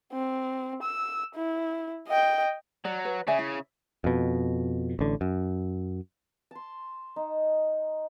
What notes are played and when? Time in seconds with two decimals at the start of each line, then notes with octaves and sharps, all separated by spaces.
0.13 C4
0.83 E6
1.35 E4
2.08 D#5 G5
2.85 F#3 D5
3.05 B4
3.27 C#3 D5 E5 G#5
3.39 E4
4.04 F2 B2
4.99 A1 D3
5.21 F#2
6.51 A5 C6
7.16 D#4